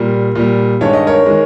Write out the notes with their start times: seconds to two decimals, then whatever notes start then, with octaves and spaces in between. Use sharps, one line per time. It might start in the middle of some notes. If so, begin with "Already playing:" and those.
Already playing: A#2 G3 A#4
0.35 A#2 G3
0.81 G2 D#3 G#3 C#5
0.93 D#5
1.07 A#4 C#5
1.26 D#3 G#3